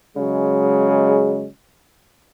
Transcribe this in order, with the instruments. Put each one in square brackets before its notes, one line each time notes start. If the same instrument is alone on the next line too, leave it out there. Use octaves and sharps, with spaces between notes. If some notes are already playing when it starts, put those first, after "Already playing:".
[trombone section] C#3 F#3 G#3